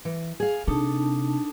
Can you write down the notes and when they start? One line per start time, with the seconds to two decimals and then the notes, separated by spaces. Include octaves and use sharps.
0.05 E3
0.40 G#4 F5
0.68 C3 D4 D#4 A4 A5